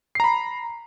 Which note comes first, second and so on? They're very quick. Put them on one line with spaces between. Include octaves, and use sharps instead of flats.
C7 A#5 B5